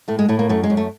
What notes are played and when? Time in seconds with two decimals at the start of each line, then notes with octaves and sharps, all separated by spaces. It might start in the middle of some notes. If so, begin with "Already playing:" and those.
0.08 A2 A3
0.19 G#3
0.29 A2 A3
0.39 A#3
0.49 F#2 A3
0.64 G#3
0.70 F#2
0.77 A3